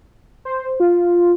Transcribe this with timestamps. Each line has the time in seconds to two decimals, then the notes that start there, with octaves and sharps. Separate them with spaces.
0.45 C5
0.80 F4